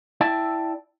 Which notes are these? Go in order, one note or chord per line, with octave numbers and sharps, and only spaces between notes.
E4 D5 E5 G5 A5